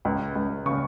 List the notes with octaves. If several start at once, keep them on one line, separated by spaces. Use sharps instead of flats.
C#2
C#2
C#3 C#6